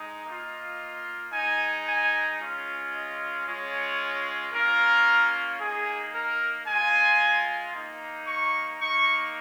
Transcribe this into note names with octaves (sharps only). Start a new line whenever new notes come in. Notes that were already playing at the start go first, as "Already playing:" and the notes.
Already playing: G#3 D#4
A#3 F4 D#5
G#3 D#4 G#5
G#5
G#3 C#4 F4
D#5
G#3 C#4 F4 C#5
A#3 C#4 F4 A#4
A#3 D#4 G#4
A#4
G#3 F4 G#5
A#3 D#4
C#6
A#3 D#4 C#6